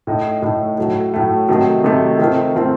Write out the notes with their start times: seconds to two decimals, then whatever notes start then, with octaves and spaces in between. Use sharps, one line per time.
0.07 A2 A3 D#4
0.42 A2 A3 D#4
0.78 A2 F#3 A3
1.14 A2 F#3 A3
1.49 C3 D#3 F#3 A3
1.84 C3 D#3 F#3 A3
2.19 D#3 A3 C4 F4
2.55 D#3 A3 C4 F4